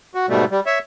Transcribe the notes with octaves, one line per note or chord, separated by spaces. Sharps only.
F#4
G#2 B2 G3 A3
G3
C#5 E5